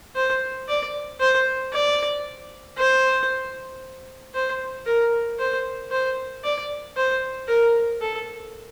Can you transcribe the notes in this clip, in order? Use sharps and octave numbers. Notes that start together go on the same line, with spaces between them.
C5
D5
C5
D5
C5
C5
A#4
C5
C5
D5
C5
A#4
A4